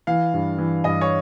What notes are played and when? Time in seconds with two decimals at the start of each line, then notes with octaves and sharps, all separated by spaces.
0.07 E3 F5
0.34 G2
0.58 E3
0.84 G2 D#5
1.01 C#5